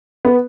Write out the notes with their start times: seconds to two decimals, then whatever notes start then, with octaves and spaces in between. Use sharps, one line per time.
0.25 B3